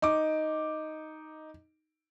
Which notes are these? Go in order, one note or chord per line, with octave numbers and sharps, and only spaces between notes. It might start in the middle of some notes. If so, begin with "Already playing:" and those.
D#4 D6